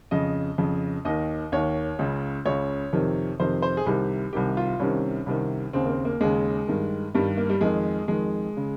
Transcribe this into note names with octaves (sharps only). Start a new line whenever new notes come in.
F2 C#3 D#5
F2 C#3
D#2 D#3 D#5
D#2 D#3 C#5
C#2 C#3
C#2 C#3 C#5
F2 C3 D#3
F2 C3 D#3 C5
C5
G#4
C2 C3 D#3 G4
C2 C3 D#3 G4
F4
C2 C3 D#3 C#4
C2 C3 D#3
D#2 C#3 C4
A#3
C4
A#3
D#2 C#3 G#3
G2 D#3
G2 D#3 G3
A#3
G3
F2 D#3 G#3
F2 D#3 G#3
C#3